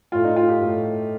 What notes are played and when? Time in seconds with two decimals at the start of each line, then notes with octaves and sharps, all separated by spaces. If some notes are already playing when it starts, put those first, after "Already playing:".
0.12 A2 A3 F4
0.25 D#4
0.36 F4
0.49 G4
0.61 A2 A3